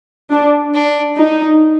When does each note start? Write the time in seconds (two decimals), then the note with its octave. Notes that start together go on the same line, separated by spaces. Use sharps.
0.31 D4
0.74 D4
1.18 D#4